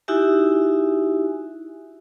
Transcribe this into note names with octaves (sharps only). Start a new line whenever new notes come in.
D#4 E4 F#4 G4 E5 G#5